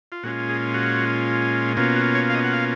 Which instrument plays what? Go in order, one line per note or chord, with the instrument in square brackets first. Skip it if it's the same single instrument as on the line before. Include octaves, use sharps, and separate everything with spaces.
[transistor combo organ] F4
A#2 G#3 C#4 F4 F#4
G#4
F#4
B2 A#3 C#4 F4
F#4
C#5
F5
D#5
F#5
F5